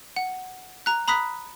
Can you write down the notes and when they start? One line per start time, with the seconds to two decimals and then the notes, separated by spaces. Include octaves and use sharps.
0.16 F#5
0.86 A#5 F#6
1.08 A#5 B5 D#6 F#6 B6